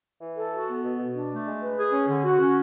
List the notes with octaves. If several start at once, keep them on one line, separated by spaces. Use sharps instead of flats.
E3
A4
F#4
B3
B2
B2
D4
A3
G#3
B4
G#4
C#4
D3
F#4
C#4